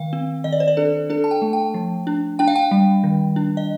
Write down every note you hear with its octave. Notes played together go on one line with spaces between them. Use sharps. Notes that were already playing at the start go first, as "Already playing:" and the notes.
Already playing: D#3 F5
C4
D#3 D#5
D5
C5
D5
D4 A4
D4 A4
A5
G5
A3
G5
F3
D4
D4 G5
F5
G5
G3
D#3
D4
D#5